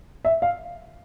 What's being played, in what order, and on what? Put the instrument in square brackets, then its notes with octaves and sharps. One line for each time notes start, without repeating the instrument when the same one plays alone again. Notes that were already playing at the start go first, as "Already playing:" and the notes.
[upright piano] E5
F5